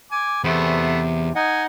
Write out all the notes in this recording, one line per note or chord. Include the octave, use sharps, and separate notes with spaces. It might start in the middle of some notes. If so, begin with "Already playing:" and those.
G#5 D6
E2 C3 A3 B3 C5
D#4 D#5 F#5 G#5